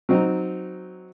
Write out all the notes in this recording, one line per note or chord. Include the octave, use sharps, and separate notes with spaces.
F#3 C4 D#4